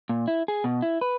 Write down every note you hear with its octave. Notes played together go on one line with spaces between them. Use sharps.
A#2
E4
G#4
B2
E4
B4